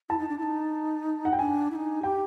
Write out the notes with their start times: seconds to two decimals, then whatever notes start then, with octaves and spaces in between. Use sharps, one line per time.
0.10 E4 A5
0.19 D#4
0.29 D4
0.38 E4
0.43 D#4
1.25 F#5
1.33 G5
1.39 D4 G#5
1.71 E4
1.75 D#4
2.03 G4 G5